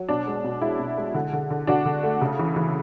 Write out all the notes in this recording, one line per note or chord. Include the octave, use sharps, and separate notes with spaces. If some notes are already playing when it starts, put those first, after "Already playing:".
Already playing: F#3
B2 D4
G#3
B2
G#3 E4
B2
G#3
D3
D3
D3
D3 D4 F#4
D3
A3
C#3
E3
E3